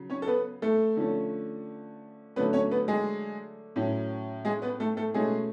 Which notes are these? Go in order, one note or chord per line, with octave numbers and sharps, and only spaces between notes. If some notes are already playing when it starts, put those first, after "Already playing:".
Already playing: C#3 F#3
C#4 C#5
A4
B3 B4
A3 A4
D3 F3 A3 C#4
D3 F#3 A3 B3 C#4 B4
C#4 C#5
B3 B4
G#3 G#4
A2 F#3 C#4
G#3 G#4
B3 B4
A3 A4
A3 A4
B2 G#3 A3 C#4 G#4